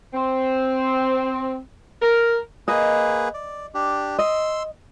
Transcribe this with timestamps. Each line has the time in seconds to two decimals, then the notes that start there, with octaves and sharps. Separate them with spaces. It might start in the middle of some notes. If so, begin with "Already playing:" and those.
0.14 C4
2.02 A#4
2.68 A#3 G#4 B4 D#5
3.34 D5
3.74 D4 G4
4.18 D#5 C6 E6